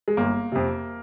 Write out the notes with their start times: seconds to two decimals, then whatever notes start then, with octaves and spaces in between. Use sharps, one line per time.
0.08 G#3
0.17 G1 A#3
0.52 F2 C3